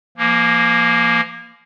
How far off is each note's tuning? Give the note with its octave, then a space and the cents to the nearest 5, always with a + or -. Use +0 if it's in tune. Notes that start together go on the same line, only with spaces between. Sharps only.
F3 -45 A#3 +0